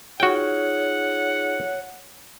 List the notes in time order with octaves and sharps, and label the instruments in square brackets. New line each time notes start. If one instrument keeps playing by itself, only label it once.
[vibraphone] D#4 F4 G#4 [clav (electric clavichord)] F#4 G5 [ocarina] C#5 [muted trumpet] F#5